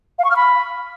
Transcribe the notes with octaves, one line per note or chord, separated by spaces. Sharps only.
F5
C#6
F6
B5